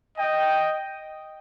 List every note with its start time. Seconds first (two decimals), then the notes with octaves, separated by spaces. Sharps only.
0.17 D#5 G5